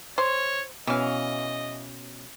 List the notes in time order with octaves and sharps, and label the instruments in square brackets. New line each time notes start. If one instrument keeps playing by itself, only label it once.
[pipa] C5 [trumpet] C#5
[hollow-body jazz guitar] B2 C#4 [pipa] E3 F5 [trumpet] D#5